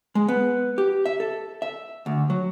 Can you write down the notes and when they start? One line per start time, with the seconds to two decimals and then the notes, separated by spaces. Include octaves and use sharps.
0.15 G#3
0.28 B3
0.78 G4
1.06 E5
1.20 A4
1.62 E5
2.06 D2
2.30 F#3